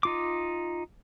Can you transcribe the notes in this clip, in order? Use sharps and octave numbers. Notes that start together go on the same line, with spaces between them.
D#4 F4 D6